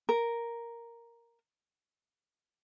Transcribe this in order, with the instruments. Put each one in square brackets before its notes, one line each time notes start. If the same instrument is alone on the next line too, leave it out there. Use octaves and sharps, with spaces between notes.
[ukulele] A#4